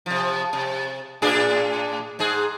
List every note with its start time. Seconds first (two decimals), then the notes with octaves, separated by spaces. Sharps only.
0.06 C3 F3
0.53 C3
1.22 A2 D4 G#4
2.19 G#2 G#4